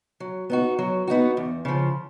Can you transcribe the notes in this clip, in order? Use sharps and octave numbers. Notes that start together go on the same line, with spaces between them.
F#3
B3 D#4 F#4
F#3
B3 D#4 F#4
E2
C#3 F3